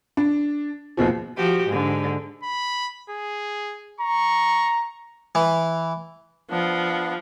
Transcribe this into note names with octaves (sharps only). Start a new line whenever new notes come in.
D4
D#2 B2 F3
F3 F#4 G4
G#2 D3
B5
G#4
A#5 C#6
E3
F3 B3 D4